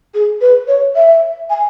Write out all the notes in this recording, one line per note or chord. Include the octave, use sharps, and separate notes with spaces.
G#4
B4
C#5
E5
G#5